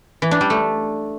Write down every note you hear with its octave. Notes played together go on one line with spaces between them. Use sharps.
E3
D4
G3
A3